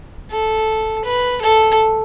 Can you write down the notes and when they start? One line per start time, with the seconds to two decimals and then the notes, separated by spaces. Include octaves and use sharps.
0.31 A4
1.05 B4
1.42 A4